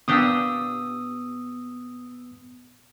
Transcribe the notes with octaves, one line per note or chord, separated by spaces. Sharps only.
A#2 B3 D4 G4 D#6 E6